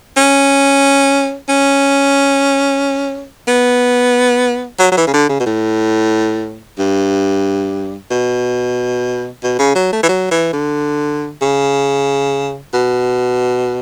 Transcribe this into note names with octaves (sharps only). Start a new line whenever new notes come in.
C#4
C#4
B3
F#3
F#3
E3
C#3
D3
C#3
B2
A2
G2
B2
B2
C#3
F#3
A3
E3
F#3
E3
D3
C#3
B2